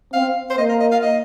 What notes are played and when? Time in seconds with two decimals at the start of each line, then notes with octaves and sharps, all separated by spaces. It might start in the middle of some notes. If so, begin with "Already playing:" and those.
0.13 C4 F5
0.50 C5
0.58 A#3 D#5
0.69 A#4
0.81 D#5
0.92 F5
1.03 D#5